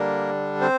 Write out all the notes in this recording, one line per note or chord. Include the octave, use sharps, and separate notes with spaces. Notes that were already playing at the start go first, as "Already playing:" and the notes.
Already playing: D3 G3 A#3 D4 A#4
C4 C5